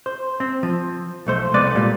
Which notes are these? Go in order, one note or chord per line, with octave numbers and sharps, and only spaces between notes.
C5
C4
F3
B1 A3 C5
C2 G#3 B3 B4 D5
A#2 G3